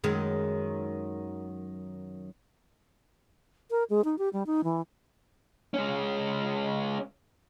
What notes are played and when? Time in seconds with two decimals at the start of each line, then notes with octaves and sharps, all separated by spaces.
0.04 F#2 D#3 G#3
3.71 A#4
3.90 G#3
4.04 D#4
4.18 G4
4.33 G3
4.46 D#4
4.64 E3
5.74 G#3 C#4